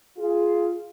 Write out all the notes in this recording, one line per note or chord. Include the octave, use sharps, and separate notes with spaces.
F4 G#4